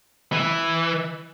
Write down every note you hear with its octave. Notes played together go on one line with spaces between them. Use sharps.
E3